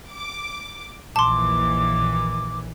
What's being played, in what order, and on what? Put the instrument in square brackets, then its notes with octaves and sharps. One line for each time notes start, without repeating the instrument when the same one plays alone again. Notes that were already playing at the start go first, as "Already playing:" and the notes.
[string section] D6
[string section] A#1 D#2 E3 [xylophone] A5 C6 [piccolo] D6